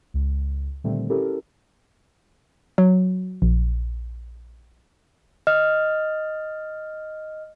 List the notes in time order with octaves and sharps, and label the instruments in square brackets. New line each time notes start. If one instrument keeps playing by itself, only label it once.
[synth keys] C#2
A#2 D3 D#3 G3 A3 C4
C#4 E4 G4 A4 A#4
[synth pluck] F#3
A#1
[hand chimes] D#5 F6